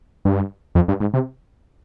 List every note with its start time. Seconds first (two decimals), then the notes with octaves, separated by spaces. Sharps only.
0.25 G2
0.75 F2
0.88 G2
1.00 G#2
1.14 C3